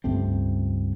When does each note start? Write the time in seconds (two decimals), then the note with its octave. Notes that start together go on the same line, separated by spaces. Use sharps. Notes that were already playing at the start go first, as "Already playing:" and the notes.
0.04 C#2 G2 A3 C4